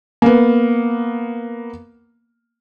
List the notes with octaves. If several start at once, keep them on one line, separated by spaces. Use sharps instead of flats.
A#3 B3